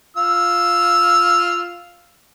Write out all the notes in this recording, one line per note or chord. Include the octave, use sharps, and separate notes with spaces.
F4 E6